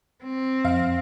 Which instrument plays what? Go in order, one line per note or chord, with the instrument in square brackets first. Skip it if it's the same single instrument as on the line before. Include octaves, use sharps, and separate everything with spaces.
[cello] C4
[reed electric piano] F2 [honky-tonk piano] F5